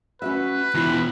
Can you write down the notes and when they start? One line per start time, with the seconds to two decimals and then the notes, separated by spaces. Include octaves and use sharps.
0.22 C#4 F#4 B4 E5
0.75 E2 B2 E4 F4